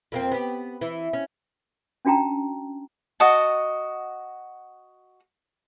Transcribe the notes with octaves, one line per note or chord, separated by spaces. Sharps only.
F2 A#3 C4
B3 G4
E3
C#4
C#4 D4 F#4 G5 A5 A#5
F#4 D#5 F#5 A5